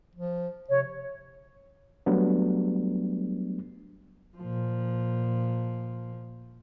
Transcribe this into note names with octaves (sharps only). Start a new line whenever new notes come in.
F3
C3 C#5
F#3 G3 A3 B3 D4
A#2 F3